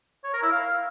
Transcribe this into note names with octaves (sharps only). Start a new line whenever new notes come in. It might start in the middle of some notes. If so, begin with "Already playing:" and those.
C#5
A#4
E4
F5